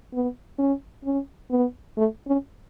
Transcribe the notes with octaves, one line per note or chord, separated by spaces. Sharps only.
B3
C#4
C#4
B3
A3
C#4